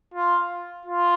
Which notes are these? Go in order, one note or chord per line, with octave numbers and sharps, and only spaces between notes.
F4
F4